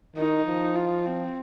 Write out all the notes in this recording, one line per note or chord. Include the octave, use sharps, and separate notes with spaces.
D#3 D#4
F3
F4
C4